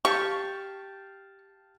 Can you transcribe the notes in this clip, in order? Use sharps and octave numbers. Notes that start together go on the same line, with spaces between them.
G4 F5 G5 A5 C#6